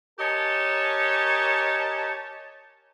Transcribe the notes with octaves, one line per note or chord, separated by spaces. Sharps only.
G4 A#4 C#5 D#5 G#5 A5